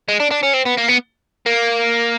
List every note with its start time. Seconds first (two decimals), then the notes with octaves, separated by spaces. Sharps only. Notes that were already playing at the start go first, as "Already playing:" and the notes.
0.08 G#3
0.20 D4
0.31 D4
0.43 C#4
0.53 C4
0.65 B3
0.77 A#3
0.88 B3
1.46 A#3